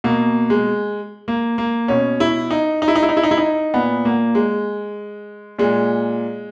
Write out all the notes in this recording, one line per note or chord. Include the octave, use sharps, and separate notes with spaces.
B2 A#3
G#3
A#3
A#3
B2 C#4
E4
D#4
D#4
E4
D#4
E4
D#4
E4
D#4
E4
D#4
A#2 B3
A#3
G#3
A#2 G#3